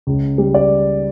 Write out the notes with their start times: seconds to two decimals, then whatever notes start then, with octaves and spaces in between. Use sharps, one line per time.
0.07 C#2
0.38 G3
0.54 D5